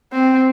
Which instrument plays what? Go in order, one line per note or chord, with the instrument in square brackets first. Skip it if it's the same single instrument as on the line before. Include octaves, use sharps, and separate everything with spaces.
[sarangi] C4